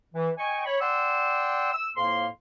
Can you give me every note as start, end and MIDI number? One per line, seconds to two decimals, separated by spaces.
0.14 0.30 52
0.38 0.64 75
0.38 0.64 79
0.38 0.64 80
0.38 0.64 85
0.65 0.76 73
0.65 0.76 83
0.80 1.70 74
0.80 1.70 78
0.80 1.70 79
0.80 1.70 84
0.80 1.70 88
1.72 1.89 88
1.96 2.26 41
1.96 2.26 45
1.96 2.26 58
1.96 2.26 77
1.96 2.26 84